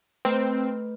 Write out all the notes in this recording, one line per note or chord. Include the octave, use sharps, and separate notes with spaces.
A3 C4 B4